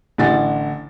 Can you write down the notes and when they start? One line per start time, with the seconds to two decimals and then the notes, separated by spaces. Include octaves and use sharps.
0.18 A1 D3 F#5 A6